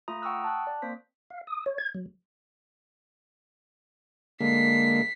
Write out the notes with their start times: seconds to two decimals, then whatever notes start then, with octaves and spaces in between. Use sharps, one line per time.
0.08 A3 F4 A#5 D#6
0.22 F#5 G5 C#6 D#6 E6 F#6
0.44 A5 F#6
0.67 D5
0.82 A#3 C4 C5 B6
1.30 F5
1.47 D#6
1.66 C#5
1.78 G#6
1.94 F#3
4.41 D3 G#3 A#3 B6 C7